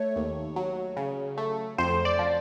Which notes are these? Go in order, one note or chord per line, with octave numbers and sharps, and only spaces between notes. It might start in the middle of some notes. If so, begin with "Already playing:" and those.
Already playing: A3 C#5
D#2
F#3
C#3
A3
F2 C5
D5
F3